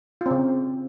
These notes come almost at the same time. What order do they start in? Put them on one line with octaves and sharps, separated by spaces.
F4 C4 C#3